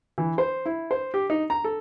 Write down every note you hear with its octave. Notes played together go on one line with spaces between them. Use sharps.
E3
C5
E4
C5
G4
D#4
A#5
A4